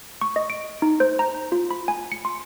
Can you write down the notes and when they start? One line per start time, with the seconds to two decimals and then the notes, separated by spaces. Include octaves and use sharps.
0.21 C#6
0.36 D#5
0.50 D7
0.82 D#4
1.00 C5
1.19 A#5
1.52 F4
1.71 B5
1.88 G#5
2.12 C#7
2.25 C6